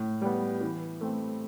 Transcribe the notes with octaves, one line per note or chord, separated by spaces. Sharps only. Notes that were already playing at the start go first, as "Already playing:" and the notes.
Already playing: A2
G3 B3
E3
A3 C4